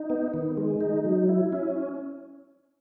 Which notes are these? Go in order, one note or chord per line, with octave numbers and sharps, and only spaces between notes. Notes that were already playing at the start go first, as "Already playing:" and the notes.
Already playing: D#4
B3
D#3
G#3
D#4
F#3
E4
C#4